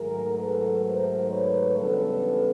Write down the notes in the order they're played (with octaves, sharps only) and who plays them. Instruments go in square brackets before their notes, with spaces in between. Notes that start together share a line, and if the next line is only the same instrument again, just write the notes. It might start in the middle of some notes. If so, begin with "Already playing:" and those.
Already playing: [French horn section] G#2 D#3 F#3 A3 G#4 A#4
A4 B4
A#4 C5
B4 C#5
C#3 E3 G3 B3 D4 A4 B4